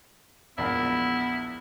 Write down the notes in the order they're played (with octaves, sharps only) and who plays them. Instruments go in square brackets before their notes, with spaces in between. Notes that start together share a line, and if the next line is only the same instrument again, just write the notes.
[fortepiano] A#1 E2 G#3 [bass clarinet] B3 [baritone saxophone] E4